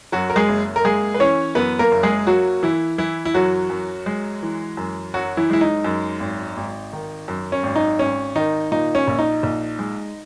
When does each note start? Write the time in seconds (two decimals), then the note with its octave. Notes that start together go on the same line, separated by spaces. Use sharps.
0.12 F#2 F#3 F#4
0.30 A#4
0.36 G#3 G#4
0.49 F#1
0.76 A#4
0.85 G#3 A#3 G#4
1.14 B4
1.20 E3 C#4 C#5
1.55 F#2 B3 B4
1.79 A#3 A#4
1.92 F#1
2.03 G#3 G#4
2.27 F#3 A#3 F#4
2.63 E3 E4
2.98 E3 E4
3.25 E4
3.34 F#2 F#3 F#4
3.70 F#2
4.06 G#3
4.43 E3
4.77 F#2
5.14 F#2 F#3 F#4
5.37 E3 E4
5.50 G#3 E4
5.61 D#4
5.84 F#2
6.20 G#1
6.57 G#1
6.93 D#3
7.28 F#2
7.52 C#4
7.63 G#1
7.76 D#4
7.99 G#1 C#4
8.36 D#3 D#4
8.72 A#2 D#4
8.95 C#4
9.08 A#1
9.19 D#4
9.43 A#1
9.79 G#3